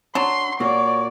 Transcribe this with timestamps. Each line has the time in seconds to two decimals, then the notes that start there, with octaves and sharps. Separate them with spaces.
0.15 F#3 D4 A5 A#5 C6
0.60 A#2 A#3 F#4 C#5 D5